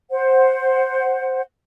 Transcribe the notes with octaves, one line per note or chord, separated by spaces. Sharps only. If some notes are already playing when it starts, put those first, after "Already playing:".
C5 F#5